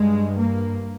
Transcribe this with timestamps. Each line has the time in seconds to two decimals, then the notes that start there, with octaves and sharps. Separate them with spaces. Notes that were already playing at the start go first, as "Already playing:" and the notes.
Already playing: G2 G#3
0.38 A#3